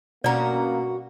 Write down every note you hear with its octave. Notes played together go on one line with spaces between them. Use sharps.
G2 B2 A#3 C#4 F#4 D5 A#5